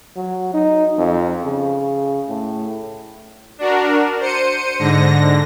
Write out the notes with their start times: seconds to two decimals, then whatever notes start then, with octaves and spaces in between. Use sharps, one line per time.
0.16 F#3
0.54 D#4
0.98 F2
1.45 C#3
2.29 A2
3.58 D4 F#4 A#4
4.20 C5 C#7 D#7
4.79 G#2 D3 A#6